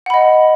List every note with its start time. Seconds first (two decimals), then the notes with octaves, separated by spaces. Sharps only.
0.06 F#5
0.10 B5
0.14 D#5